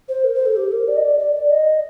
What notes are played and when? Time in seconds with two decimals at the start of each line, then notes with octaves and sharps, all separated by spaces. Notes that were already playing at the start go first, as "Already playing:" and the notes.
0.09 C5
0.24 A#4
0.35 C5
0.46 A4
0.56 G4
0.72 A#4
0.88 D5
0.96 D#5
1.03 D5
1.19 D5
1.35 D5
1.51 D#5